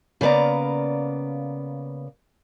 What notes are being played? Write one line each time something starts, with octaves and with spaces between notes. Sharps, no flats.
C#3 A#3 B3 D5 A#5